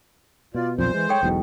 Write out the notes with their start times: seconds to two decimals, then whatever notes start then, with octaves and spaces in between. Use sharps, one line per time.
0.55 B2 F4 D5
0.78 B1 F2 A#2 C5
0.94 E3 G#3
1.09 A4 C#5 G5
1.23 E1 B1 E2 B2